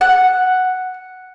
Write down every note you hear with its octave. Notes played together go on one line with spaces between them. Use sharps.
F#5